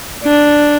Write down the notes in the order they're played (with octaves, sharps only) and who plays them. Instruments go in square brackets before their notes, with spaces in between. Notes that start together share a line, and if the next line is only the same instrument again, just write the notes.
[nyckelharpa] D4